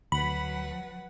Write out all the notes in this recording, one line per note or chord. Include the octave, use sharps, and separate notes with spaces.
D2 F#3 B4 F#5 B5